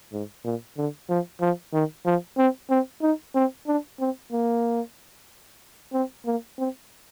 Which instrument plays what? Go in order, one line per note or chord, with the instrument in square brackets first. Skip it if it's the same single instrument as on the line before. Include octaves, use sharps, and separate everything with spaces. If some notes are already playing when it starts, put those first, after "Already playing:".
[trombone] G#2
A#2
D3
F3
F3
D#3
F3
C4
C4
D#4
C4
D4
C4
A#3
C4
A#3
C4